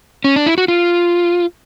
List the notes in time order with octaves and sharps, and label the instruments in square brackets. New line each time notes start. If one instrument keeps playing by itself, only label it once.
[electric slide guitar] C#4
D4
E4
F#4
F4